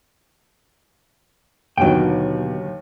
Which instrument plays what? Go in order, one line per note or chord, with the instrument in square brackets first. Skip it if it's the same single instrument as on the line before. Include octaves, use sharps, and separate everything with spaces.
[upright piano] D#2 D#3 [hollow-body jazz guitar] B2 G5 [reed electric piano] D3 F#3